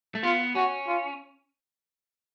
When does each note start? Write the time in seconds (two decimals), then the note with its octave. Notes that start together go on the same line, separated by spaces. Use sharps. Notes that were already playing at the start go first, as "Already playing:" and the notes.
0.15 A3
0.23 B3 F4
0.55 C#4 F#4
0.87 F4